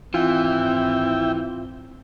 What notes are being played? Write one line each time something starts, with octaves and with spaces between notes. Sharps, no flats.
G#1 E3 C4 E4 F4 G5